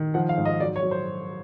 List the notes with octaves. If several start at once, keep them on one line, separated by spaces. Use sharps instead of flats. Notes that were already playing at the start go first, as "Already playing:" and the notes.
Already playing: D#3
F3 F#5
F5
G#2
D#5
F#3 D5
C#5
F#3
C5